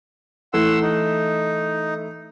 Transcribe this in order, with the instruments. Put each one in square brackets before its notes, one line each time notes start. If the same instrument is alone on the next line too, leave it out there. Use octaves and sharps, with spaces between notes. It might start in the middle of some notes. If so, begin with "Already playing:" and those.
[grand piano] E3 A3 E4 [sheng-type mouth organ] F#5 C6 E6
[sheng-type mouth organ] D#4